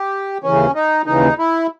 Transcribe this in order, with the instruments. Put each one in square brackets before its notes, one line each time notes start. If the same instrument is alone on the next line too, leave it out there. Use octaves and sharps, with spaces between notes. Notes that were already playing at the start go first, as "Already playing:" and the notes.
Already playing: [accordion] G4
[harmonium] D#2 C#3 E3 [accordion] C#4
[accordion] D#4
[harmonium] D#2 C#3 E3 [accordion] D#4
[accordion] E4